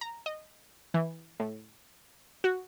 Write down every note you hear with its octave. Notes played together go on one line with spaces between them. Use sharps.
A#5
D#5
E3
A2
F#4